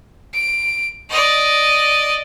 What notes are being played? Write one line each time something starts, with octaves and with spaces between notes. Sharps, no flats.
D7
D5 D#5